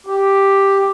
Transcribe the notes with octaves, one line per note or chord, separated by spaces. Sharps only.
G4